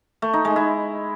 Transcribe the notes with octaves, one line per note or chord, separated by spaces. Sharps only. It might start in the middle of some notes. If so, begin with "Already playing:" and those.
A3
D#4
G#3
E4